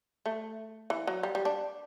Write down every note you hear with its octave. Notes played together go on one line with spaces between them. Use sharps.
A3
E3
F#3
G3
G3
D4